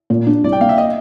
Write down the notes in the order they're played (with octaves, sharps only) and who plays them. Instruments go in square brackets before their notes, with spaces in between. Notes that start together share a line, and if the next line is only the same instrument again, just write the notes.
[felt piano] A#2
D4
[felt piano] C2 [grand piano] D5
[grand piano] G5
[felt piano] A#3 [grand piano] F5
[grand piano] E5
D#5